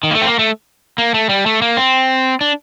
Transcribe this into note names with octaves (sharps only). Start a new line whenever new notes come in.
D#3
A#3
A3
C4
A#3
A3
A#3
A3
G3
A3
A#3
C4
D4